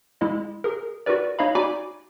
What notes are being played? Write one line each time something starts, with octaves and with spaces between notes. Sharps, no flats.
G#3 E4 D#5
G#4 A#4
F#4 G4 A#4 B4 D5
D#4 C#5 D#5 F5 B5
D#4 F#4 D5 G#5 B5 D6